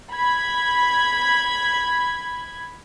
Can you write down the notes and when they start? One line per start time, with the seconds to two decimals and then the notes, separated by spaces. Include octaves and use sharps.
0.13 B5 G#6